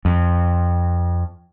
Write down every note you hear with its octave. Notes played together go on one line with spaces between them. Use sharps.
F2